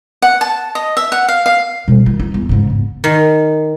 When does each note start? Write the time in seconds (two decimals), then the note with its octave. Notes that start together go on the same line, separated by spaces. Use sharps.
0.22 F#5
0.41 A5
0.75 D#5
0.97 E5
1.12 F#5
1.28 F5
1.46 F5
1.88 B2 G3
2.06 D#3
2.20 D#4
2.34 E2
2.49 G#2 C#3
2.70 E2
3.04 D#3